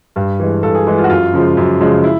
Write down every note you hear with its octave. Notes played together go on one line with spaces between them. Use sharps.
G2
E3 G#3
G2 A4
G#4
E3 G#3
F4
F#4
F#2 F4
C#3 F3 G#3
F#2
C#3 F3 G#3
E4